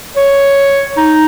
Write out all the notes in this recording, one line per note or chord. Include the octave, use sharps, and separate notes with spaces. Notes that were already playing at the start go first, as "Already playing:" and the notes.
C#5
D#4